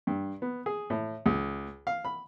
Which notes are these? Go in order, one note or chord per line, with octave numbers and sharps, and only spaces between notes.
G2
B3
G#4
A2
C#2
F5
B5